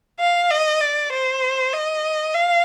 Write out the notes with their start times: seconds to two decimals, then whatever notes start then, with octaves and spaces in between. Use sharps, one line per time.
0.20 F5
0.50 D#5
0.81 D5
1.12 C5
1.73 D#5
2.35 F5